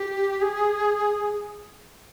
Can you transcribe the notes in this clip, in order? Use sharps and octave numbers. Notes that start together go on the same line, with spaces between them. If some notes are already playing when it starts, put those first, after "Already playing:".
Already playing: G4
G#4